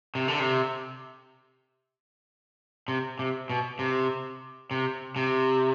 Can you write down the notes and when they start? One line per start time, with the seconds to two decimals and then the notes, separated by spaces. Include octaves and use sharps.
0.15 C3
0.28 D3
0.40 C3
2.88 C3
3.19 C3
3.50 B2
3.79 C3
4.71 C3
5.16 C3